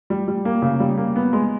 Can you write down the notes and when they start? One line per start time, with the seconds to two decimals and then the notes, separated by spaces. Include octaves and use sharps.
0.10 G3
0.28 G3
0.45 A#3
0.62 C#3
0.80 G3
0.97 A#3
1.16 B3
1.33 G#3